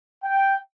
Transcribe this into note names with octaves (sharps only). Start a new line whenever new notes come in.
G5